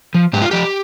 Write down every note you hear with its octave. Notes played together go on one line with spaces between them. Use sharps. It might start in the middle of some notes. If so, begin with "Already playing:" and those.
F3
G#2 G4
F4
F3 G4